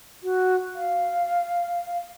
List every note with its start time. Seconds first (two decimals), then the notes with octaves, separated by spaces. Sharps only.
0.23 F#4
0.75 F5